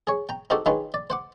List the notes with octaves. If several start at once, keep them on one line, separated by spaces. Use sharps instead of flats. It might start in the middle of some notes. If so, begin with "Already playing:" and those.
G#4 C#5
G5 A#5
C4 D#4 F#4 G4 A4 C5
D#3 C#4 D#4 F4 G#4 B4
D5
C5 F#5 D6